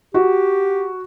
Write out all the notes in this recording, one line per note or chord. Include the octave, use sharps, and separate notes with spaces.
F#4 G4